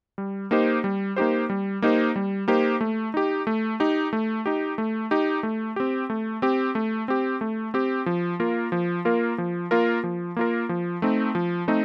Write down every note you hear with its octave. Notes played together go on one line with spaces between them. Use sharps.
G3
A#3 D#4 G4 C5
G3
A#3 D#4 G4 C5
G3
A#3 D#4 G4 C5
G3
A#3 D#4 G4 C5
A3
D#4 G4
A3
D#4 G4
A3
D#4 G4
A3
D#4 G4
A3
C4 G4
A3
C4 G4
A3
C4 G4
A3
C4 G4
F3
A#3 F4 A#4
F3
A#3 F4 A#4
F3
A#3 F4 A#4
F3
A#3 F4 A#4
F3
A3 C4 D#4
F3
A3 C4 D#4